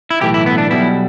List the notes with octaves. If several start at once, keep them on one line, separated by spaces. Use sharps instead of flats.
E4
B1 A2 E3 G4
E4
B3
D4
B1 B2 G3 E4